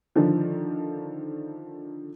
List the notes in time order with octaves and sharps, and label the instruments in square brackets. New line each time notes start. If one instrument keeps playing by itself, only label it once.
[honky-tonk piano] D3 D#3 F3